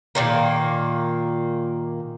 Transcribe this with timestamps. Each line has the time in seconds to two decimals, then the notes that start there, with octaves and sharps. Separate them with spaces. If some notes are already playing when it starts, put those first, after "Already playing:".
0.15 A#2 D#3 A#3